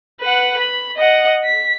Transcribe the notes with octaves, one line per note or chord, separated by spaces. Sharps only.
B4 F#5
B5
D#5 F#5
B6